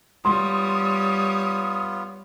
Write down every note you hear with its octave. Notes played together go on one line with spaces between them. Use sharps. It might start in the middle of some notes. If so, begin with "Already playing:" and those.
G3 B3 F4 C#5 C6 D#6